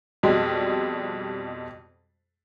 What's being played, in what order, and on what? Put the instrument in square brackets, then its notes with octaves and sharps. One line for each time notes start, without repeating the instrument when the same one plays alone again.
[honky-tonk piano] F2 B2 G3 G#3